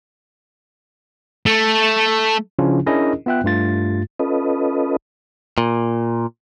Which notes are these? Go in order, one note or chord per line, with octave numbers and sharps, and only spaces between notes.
A3
C#3 F3 C#4 D4 E4 F4
C#4 D4 E4 G#4 A#4 D#5
B3 F4 E5 G5 F#6
G2 A3 F4 A6
C#4 F4 A4 B4 D#5
A#2